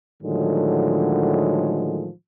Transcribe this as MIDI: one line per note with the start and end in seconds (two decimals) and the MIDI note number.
0.22 2.10 45
0.22 2.10 50
0.22 2.10 51
0.22 2.10 53
0.22 2.10 54
0.22 2.10 56